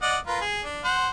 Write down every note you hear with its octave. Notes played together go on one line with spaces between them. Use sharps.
D5 D#5 F#5
F4 A#4 B4
G#4
D4
C5 F#5